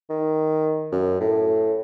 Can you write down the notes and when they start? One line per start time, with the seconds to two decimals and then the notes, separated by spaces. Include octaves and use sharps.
0.10 D#3
0.92 F#2
1.21 A2